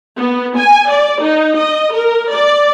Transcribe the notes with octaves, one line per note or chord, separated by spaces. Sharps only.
B3
G#5
D5
D#4
D#5
A#4
D5